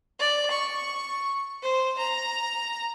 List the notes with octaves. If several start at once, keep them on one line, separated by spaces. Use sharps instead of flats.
D5
C#6
C5
A#5